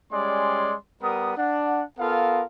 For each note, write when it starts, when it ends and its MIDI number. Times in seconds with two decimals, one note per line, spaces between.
0.12 0.74 55
0.12 0.74 56
0.12 0.74 61
0.12 0.74 74
0.12 0.74 84
1.03 1.35 55
1.03 1.35 59
1.03 1.35 70
1.03 1.35 87
1.37 1.84 62
1.37 1.84 78
1.99 2.43 59
1.99 2.43 65
1.99 2.43 69
1.99 2.43 70
1.99 2.43 77